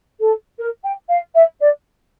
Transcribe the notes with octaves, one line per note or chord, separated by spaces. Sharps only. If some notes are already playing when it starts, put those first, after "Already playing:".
A4
A#4
G5
F5
E5
D5